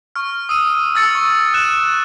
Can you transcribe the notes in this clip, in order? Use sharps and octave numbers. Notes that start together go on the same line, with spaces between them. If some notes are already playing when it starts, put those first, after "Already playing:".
C#6 F6
D#6 E6 D#7
E6 A6 C#7
C#6
F#6 E7